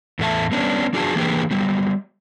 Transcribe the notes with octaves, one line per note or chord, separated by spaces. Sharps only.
E2 A2 A3 E5 A5
G3 B3 C#4 D4
F#3 D4 F#4 G#4 A5
E3 A#3 D4 G4 G#4 B4
F#3 G3 B3